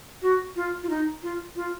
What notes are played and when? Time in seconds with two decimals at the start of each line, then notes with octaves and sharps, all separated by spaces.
0.22 F#4
0.56 F4
0.83 F4
0.90 D#4
1.23 F4
1.56 F4